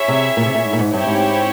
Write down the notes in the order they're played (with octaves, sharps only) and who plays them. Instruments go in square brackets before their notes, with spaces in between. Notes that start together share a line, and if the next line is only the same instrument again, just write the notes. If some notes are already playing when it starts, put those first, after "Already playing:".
Already playing: [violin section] E4 G#4 C#5 E5
[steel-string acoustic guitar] C3
A#2
C3
A#2
G#2
A#2
G#2
[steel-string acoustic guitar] G2 [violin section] C4 E4 G4 C#5
[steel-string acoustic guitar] G#2